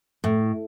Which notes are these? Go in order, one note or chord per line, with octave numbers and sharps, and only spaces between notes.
A2